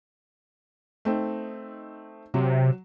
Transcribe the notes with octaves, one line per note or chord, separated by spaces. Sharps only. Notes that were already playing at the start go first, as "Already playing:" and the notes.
A3 C4 D#4
C3 F#3